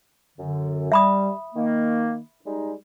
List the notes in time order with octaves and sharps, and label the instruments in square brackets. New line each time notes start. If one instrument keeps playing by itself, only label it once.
[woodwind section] F#2 D3
[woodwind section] G3 [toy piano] E5 B5 D#6
[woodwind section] D#3 A#3
G3 G#3 D#4